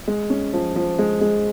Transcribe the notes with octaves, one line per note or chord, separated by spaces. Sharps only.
G#3
C#4
F3
F3
G#3
G#3